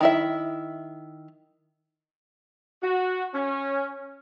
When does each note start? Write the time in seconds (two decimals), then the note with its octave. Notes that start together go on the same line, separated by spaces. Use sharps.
0.01 D#3 E4 E5
2.82 F#4
3.34 C#4